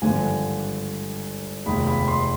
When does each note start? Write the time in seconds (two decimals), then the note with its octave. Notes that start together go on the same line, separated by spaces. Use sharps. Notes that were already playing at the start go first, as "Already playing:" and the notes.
0.02 G#1 G2 D3 F3 G#5
1.66 F1 D#2 D#3 G#3 B5
1.87 B5
2.08 C6